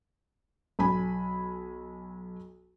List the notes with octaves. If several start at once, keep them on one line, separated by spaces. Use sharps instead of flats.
B1 G#5 B5